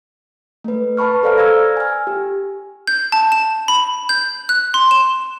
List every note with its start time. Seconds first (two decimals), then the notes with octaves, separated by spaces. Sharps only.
0.64 A3 B4
0.97 B4 A5 B5 C#6 F6
1.23 A4 C5 D5 F5 A#5 F6
1.38 E6 F6 G#6 A#6
1.77 G#5 F6
2.07 G4
2.87 G6
3.12 A5
3.32 E7
3.68 B5
4.09 G6
4.49 F#6
4.74 C6
4.91 E7